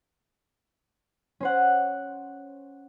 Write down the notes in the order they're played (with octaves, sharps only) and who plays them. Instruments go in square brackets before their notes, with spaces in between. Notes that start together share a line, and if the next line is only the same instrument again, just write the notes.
[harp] C#4 C5 F#5